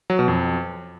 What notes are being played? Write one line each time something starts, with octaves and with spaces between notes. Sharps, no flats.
F#3
B2
F2